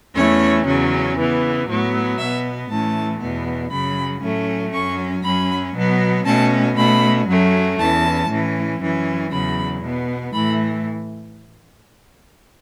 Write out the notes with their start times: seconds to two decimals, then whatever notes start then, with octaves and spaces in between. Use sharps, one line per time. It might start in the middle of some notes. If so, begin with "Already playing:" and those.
0.15 E2 E3 A3 C#4 C#5
0.65 E2 C#3 F#3 C#4
1.17 C#3 E3 B3
1.67 A2 F#3 B3
2.18 B2 B3 E5
2.69 A2 E3 A3 C#4 A5
3.19 E2 B2 B3
3.70 F#2 C#3 F#3 B5
4.21 A2 F#3 A3 C#4
4.73 F#2 F#3 C#4 C#6
5.23 F#2 F#3 C#4 B5
5.74 B2 F#3 B3
6.25 B2 A3 C#4 A5
6.76 B2 A3 C#4 B5
7.27 F#2 F#3 A3 C#4
7.78 E2 E3 C#4 A5
8.29 A2 E3 C#4
8.80 F#2 E3 C#4
9.31 E2 C#3 F#3 B5
9.82 B2 B3
10.32 A2 E3 A3 B5